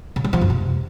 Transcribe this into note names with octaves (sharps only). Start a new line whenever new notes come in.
C#3
G3
F3
F#2
C3